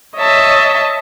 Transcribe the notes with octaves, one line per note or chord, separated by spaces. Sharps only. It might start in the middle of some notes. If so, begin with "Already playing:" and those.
C#5 D#5 E5 A5